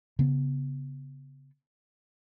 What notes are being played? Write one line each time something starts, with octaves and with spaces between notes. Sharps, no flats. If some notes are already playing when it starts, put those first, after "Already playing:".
C#3 B3